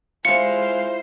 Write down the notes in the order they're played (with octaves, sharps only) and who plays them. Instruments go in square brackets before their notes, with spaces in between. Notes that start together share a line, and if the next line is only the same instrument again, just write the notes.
[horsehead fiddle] G#3 F5 [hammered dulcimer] E4 F4 [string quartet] C5 [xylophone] C#7